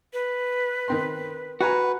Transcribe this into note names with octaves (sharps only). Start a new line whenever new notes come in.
B4
D#3 C4 C6
F#4 B4 F#5 G#5 A#5